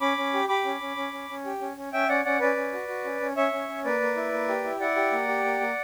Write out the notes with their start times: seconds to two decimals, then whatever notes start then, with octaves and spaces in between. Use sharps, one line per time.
0.01 C#4 B5 D6
0.18 C#4
0.34 G4
0.48 G4 B5 D6
0.65 C#4
0.81 C#4
0.96 C#4
1.13 C#4
1.29 C#4
1.45 G4
1.61 C#4
1.77 C#4
1.93 C#4 E5 G5
2.08 C#4 D5 F#5
2.25 C#4 D5 F#5
2.40 C#4 B4 D5
2.56 C#4
2.73 F#4
2.88 F#4
3.05 C#4
3.20 C#4
3.37 C#4 C#5 E5
3.52 C#4
3.69 C#4
3.84 A#3 B4 D5
4.01 A#3
4.16 E4
4.32 A#3
4.48 G4
4.64 E4
4.80 E4 D5 F#5
4.96 G4
5.12 A#3
5.28 G4
5.44 A#3
5.60 A#3